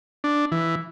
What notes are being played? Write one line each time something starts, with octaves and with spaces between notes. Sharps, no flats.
D4
E3